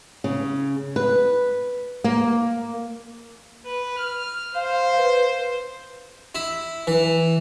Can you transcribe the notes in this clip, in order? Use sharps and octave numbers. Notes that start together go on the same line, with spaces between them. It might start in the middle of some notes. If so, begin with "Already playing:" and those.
C#3
B4
A#3
B4
F6
C5 F5
B4
E4
E3